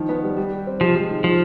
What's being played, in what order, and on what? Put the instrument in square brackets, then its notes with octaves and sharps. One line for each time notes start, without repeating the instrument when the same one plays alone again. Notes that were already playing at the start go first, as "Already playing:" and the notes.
Already playing: [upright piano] D#3 F3
B3
G3
G3
G4
C4
[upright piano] C3 [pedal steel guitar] F3
[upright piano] G#3
D#3
[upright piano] D#3 [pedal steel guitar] F3